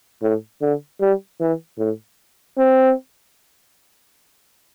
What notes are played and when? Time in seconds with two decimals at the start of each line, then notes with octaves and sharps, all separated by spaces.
0.22 A2
0.61 D3
1.01 G3
1.41 E3
1.79 A2
2.58 C4